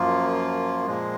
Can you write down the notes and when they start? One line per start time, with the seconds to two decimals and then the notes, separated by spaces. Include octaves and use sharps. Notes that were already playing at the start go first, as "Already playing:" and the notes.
Already playing: F#2 F3 A#3 F4
0.86 A#2 F3 G#3